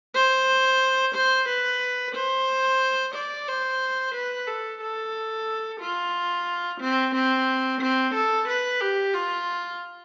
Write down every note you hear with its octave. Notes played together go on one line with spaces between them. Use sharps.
C5
C5
B4
C5
D5
C5
B4
A4
A4
F4
C4
C4
C4
A4
B4
G4
F4